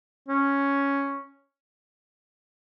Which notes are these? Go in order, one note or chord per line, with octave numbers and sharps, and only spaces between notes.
C#4